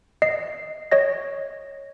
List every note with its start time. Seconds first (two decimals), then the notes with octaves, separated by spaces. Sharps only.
0.22 D#5 C7
0.91 C#5 D#5 A#6